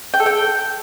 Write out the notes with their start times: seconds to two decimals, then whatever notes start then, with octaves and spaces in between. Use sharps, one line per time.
0.14 G5
0.20 A4
0.26 G5